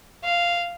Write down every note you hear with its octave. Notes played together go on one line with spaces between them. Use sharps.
F5